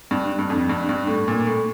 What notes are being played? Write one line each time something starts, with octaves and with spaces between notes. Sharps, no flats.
G2
G2
F2
G2
G2
A2
A#2
A2